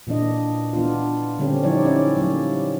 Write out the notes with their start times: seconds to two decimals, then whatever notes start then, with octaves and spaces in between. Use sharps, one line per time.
0.07 A#2 E3 A#3 D4 D#5
0.73 E3 B3 D4 F4
1.39 D3 G3 C4 C#4 G4
1.63 F3 F#3 D#4 E4 C#5 D5
1.85 C#4 E4 D5
2.17 F#3 G3 A#3